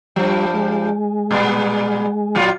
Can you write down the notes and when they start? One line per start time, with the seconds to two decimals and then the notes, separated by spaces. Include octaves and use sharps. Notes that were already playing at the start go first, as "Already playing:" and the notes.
0.16 G2 F3 G3
0.54 G#3
1.31 A#2 G3 B3
2.35 A#2 F#3 F4